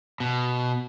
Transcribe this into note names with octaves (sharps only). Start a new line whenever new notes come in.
B2